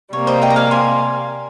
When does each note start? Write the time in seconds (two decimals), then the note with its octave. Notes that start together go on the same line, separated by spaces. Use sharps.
0.13 C3 G3 A#3 C#5
0.27 C5 D#5
0.42 D#5 G5
0.50 A#5
0.56 F5 G#5
0.71 G#5 C6